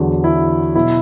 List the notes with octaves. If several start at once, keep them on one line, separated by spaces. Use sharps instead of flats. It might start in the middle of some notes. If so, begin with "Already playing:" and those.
Already playing: E2 D3 F#3
E4
B2 F#3 E4